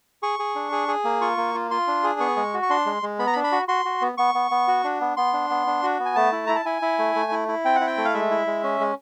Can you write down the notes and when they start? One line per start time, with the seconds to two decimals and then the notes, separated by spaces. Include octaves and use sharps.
0.23 G#4 C#6
0.39 G#4
0.55 D4
0.72 G#4
0.88 G#4
1.05 A#3
1.21 F4 C#6
1.37 A#3
1.54 F4
1.71 F4 C6
1.87 D4
2.04 G#4
2.20 B3 C#6
2.36 G#3
2.54 F#4
2.63 C#6
2.70 D4 C6
2.86 G#3
3.03 G#3
3.19 B3 B5
3.27 A#5
3.33 B5
3.36 D4
3.44 B5
3.52 F#4
3.68 F#4 C6
3.85 F#4
4.01 B3
4.18 B3 C#6
4.34 B3
4.51 B3
4.68 F#4
4.84 D4
5.01 B3
5.17 B3 C6
5.33 D4
5.50 B3
5.67 D4
5.83 F#4
6.00 B3
6.05 G#5
6.15 A3 A5
6.32 E4
6.47 E4 A#5
6.56 A5
6.65 E4 G#5
6.82 E4
6.99 A3
7.15 A3
7.31 E4
7.48 E4
7.65 C4 G5
7.76 F#5
7.81 E4
7.87 G5
7.97 A3
8.05 F5
8.14 G#3 E5
8.31 E4
8.47 G#3
8.63 C#4
8.80 G#3